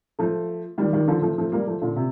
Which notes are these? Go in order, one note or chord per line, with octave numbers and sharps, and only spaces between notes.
F3 A3
D#3 G3
D#3 G3
D3 F3
F3 A3
F3 A3
G3 A#3
F3 A3
A#2 D3
C3